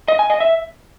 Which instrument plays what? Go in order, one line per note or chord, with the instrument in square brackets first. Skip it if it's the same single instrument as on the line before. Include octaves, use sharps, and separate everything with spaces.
[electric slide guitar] D#5
G#5
D#5
E5